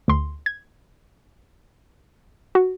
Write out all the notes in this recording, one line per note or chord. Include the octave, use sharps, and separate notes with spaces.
D2 C6
G#6
F#4